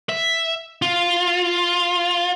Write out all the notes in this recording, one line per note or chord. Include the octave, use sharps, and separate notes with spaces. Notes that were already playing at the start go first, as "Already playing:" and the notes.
E5
F4